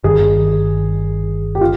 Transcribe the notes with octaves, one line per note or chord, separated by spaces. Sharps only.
G1 G2 D#3 G#4
G4
F4